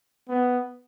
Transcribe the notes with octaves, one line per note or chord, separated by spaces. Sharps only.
B3